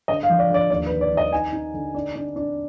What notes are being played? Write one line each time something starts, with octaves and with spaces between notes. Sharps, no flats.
D3 D#5
F5
F3
D5
D3 D5
D#2 D5
B4
D#3
D5
D#3
D#5
D#4 G#5
D#4
D3
D4
D4
D4